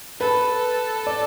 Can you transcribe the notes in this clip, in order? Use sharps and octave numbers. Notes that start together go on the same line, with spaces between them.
A4 B4
D5